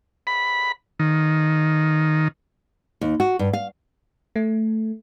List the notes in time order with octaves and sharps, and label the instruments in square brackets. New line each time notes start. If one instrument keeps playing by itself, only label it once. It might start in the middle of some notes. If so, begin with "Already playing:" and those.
[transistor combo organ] B5
D#3
[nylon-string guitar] D#2
F#4
G2
F5
[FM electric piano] A3